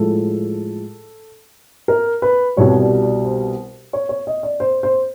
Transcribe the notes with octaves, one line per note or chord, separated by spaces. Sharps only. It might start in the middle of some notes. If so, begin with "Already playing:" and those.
Already playing: A2 F3 G#3 A4
A#4
B4
C2 B2 G3 C#5
D5
D5
C5
C#5
C#5
D#5
D5
C5
C5